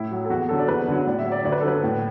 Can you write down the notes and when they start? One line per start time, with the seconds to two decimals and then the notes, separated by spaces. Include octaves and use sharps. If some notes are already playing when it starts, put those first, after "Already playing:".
Already playing: A2 E4
0.11 F#3
0.25 A4
0.30 E2 F#4
0.49 D3 F#3 A4
0.59 D5
0.68 E2 B4
0.88 D3 F#3
1.07 A2 D5
1.19 E5
1.25 F#3
1.32 D5
1.45 D2 D5
1.52 B4
1.60 A4
1.64 D3 F#3 B4
1.84 A2